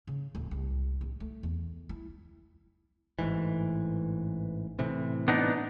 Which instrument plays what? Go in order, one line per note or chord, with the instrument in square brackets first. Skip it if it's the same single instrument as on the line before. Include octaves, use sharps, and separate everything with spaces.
[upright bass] C#3
D1
C2
D1
A3
E2
E4
[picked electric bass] A1 G#2 E3
A2 C3 E3
[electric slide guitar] B3 D4 D#4